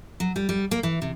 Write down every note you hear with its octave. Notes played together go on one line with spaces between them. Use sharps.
F#3
G3
G3
A#3
E3
C3